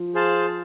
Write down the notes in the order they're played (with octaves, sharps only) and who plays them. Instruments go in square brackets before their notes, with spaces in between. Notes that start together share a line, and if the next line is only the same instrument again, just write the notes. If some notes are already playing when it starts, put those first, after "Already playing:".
Already playing: [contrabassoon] F3
[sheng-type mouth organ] G#4 C5 F5 A5